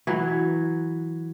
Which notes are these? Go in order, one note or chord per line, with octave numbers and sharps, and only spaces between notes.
E3 F#3